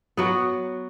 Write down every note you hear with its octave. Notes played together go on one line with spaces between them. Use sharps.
F#3 B3 F#4